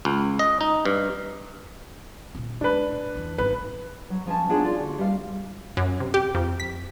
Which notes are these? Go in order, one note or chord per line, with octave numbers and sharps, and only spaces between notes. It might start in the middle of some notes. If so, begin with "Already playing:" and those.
C#2
D#5
D#4
G2
A#2 C#4
G#3 D4 B4
A2
F2 E3
G#1 B3 B4
F#3
F3 C#4 G#5 A5
B3 D4 D#4 F4 G#4 C#5
F4 D5
D3 F#4
G3 F5
F#2
C3
G4
F2
B6